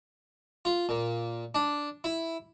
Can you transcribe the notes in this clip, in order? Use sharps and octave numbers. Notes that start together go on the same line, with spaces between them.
F4
A#2
D4
E4